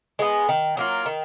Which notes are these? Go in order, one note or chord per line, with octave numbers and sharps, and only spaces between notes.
G#3 B3
D#3
F#3 A#3 F4
D#3